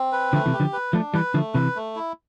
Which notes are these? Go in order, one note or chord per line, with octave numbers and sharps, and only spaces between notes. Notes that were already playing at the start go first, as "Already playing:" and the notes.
Already playing: C4
B4
D3 F3 A3
C3 E3
G4
D3 F3
B4
F3 A3 D4
E3 G3 B4
D3 F3 A3
C3 E3 B4
A3
E4